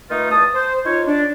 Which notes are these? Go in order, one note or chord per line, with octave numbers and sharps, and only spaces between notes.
D#3 A3 D#4 F4 B4
E2 A5 D#6
C5
D#4 F4 C#5
D4